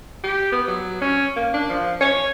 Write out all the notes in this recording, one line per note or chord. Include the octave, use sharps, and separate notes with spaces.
G4
B3
F#3
C#4
A#3
D4
F3
C#5